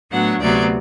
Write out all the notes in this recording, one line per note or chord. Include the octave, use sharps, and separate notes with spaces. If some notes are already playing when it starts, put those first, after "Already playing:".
A2 F#3 B3 D4 F#5
D2 C3 F#3 B3 D5